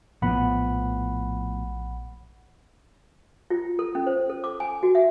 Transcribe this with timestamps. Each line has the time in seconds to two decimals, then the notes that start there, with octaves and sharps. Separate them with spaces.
0.22 A#1 A2 F3 B3 F#5 B5
3.50 F4
3.79 A4
3.95 C#4
4.07 C5
4.29 A4
4.44 D6
4.60 G#5
4.83 F#4
4.95 E5